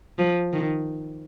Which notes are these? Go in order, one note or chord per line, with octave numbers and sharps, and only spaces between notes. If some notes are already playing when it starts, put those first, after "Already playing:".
F3
D#3